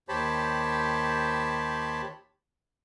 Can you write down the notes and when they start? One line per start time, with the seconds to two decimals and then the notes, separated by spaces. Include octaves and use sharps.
0.09 D#2 G4 C5 C#5 A5 B5